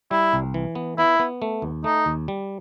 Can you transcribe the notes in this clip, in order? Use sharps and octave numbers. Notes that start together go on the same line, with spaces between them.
G3 E4
C2
E3
B3
B3 E4
B3
A3
D#2
A3 D#4
D#2
G3